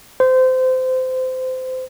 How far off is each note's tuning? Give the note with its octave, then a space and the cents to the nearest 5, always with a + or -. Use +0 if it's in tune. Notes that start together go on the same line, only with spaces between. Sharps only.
C5 -25